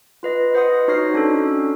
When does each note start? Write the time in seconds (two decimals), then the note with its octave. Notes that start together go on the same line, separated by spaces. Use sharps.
0.23 F4 B4 D#5
0.54 B4 C5 D#5 F#5 C6 D#6
0.88 D#4 F#4 C#5 F6 A#6 C7
1.14 C#4 D4 F#4 A4